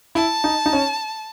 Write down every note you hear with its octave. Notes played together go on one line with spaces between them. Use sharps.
E4 A5
D#4
D#4
C#4